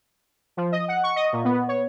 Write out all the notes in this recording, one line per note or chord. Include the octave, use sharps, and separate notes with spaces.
F3
D#5
F#5
C#6
D#5
A#2
B3
C#5